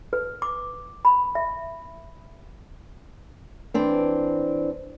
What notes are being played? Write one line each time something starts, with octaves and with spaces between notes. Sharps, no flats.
B4
D6
B5
E5
E3 C4 D4